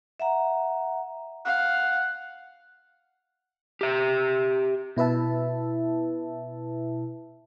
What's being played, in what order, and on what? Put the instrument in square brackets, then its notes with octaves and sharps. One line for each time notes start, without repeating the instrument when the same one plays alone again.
[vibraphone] E5 F#5 A#5
[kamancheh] F5 [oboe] F#5
[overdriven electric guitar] G4 E5
[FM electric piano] B2 E4 B4 E5 A5